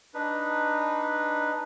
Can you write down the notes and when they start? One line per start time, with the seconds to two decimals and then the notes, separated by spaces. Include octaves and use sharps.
0.14 D4 D#4 B4